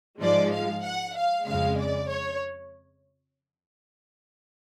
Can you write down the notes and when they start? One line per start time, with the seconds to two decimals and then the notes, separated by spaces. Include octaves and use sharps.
0.21 G#2 F3 G#3 D5
0.53 F5
0.84 F#5
1.15 F5
1.47 F2 C#3 G#3 F5
1.78 D5
2.09 C#5